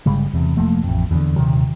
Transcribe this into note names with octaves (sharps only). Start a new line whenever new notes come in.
G1 C#3 G3 G#3
E2 C3
F1 F3 A3 A#3
A1 F2
E2 D3
D#1 C3 D#3 F#3